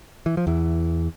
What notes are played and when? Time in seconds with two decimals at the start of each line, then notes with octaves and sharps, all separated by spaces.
0.26 E3
0.37 F3
0.47 E2 E3